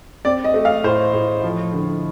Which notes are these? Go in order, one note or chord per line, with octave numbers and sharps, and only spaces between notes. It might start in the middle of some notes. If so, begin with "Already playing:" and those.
C4 D5
D#5
A3
F5
A2 C5
A2
F3
D3